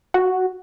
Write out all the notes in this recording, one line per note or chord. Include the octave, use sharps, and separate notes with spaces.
F#4